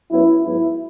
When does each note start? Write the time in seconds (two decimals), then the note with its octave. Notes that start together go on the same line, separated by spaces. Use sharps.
0.10 F#2 F#3 B3 E4
0.44 G#2 F#3 B3 E4